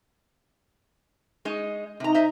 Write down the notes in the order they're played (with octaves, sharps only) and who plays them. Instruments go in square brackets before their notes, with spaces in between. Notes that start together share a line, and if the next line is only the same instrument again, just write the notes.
[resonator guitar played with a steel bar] G#3 D#4 D#5
[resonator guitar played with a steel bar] C3 A#5 [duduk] D#4
[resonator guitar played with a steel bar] C5 D#5 E5